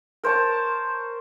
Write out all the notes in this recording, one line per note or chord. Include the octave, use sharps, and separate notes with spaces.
A#4 C5 C#5 A5